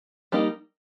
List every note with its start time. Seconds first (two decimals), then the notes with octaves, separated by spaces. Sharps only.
0.32 G3 A#3 D#4